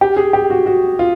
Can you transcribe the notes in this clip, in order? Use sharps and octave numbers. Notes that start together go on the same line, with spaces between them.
G4
G#4
G4
F#4
F#4
F4